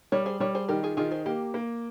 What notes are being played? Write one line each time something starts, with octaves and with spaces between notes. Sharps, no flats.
G3 A#4 C#5
G#4 C5
G3 A#4 C#5
G#4 C5
D#3 G4 A#4
F4 G#4
D#3 F4 G#4
G#4 C5
A#3 G4 A#4
A#3